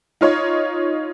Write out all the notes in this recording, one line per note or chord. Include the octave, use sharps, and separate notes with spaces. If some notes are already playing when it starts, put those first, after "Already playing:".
D#4 F4 C#5